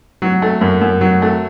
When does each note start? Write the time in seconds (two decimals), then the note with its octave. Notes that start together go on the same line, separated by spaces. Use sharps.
0.22 F#3
0.42 A3
0.61 F#2
0.81 F#2
1.01 F#3
1.22 A3